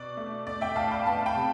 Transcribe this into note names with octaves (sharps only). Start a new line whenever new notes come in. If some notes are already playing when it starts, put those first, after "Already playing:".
Already playing: B2 D5
A3
A3 D5
E5 G5
A2 F5 A5
G5 B5
B3 F5 A5
G5 B5
C3